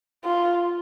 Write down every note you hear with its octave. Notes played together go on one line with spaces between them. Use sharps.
F4